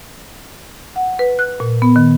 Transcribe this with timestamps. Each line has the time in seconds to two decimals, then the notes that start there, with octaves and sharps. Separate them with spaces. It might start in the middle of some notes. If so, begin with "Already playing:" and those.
0.96 F#5
1.19 B4
1.39 F#6
1.60 A#2
1.82 B3
1.96 D#3